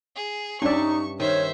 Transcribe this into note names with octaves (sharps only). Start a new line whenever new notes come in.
G#4
G2 C#4 D#4 D5 E5 C#6
D#3 C5 C#5 E5